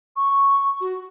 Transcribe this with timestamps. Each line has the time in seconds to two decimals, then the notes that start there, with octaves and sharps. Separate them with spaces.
0.16 C#6
0.81 F#4